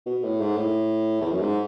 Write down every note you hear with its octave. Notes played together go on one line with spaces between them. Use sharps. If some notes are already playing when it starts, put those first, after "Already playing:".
B2
A2
G#2
A2
E2
F#2
G#2